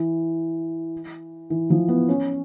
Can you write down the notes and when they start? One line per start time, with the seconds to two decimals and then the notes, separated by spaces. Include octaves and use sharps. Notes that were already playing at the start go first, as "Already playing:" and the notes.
Already playing: E3
1.50 E3
1.70 F3
1.88 B3
2.09 C#4